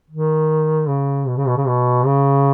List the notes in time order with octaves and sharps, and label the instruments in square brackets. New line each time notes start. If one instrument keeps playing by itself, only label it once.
[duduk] D#3
C#3
B2
C#3
B2
C#3
B2
C#3